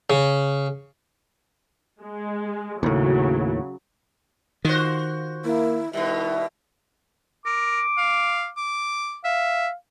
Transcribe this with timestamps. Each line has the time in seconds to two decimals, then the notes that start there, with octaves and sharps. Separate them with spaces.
0.10 C#3
2.02 G#3
2.83 D#2 A2 C#3 F#3
4.65 D#3 F4 F#4 C5
5.45 A#3 E4
5.93 B2 D#3 G3 B3 E4 E5
7.46 A#4 D6
7.98 F5
8.57 D6
9.25 E5 F5